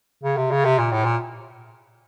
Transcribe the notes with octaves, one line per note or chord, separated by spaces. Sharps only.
C#3
C3
C#3
C3
A#2
A2
A#2